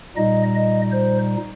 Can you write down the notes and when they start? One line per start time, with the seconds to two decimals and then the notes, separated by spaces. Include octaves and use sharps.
0.17 A#2 G3 D#4 D#5
0.55 D#5
0.92 C5